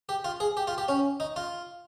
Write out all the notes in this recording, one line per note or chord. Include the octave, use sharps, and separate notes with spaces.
G4
F4
G#4
G4
F4
G4
C#4
D#4
F4